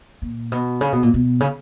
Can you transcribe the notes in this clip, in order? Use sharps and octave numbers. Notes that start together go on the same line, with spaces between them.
A#2
B2
C#3
B2
A#2
B2
C#3